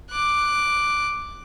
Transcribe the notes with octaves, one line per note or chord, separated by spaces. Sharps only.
D6 F#6